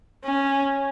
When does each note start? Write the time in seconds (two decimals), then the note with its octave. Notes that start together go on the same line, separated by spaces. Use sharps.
0.24 C#4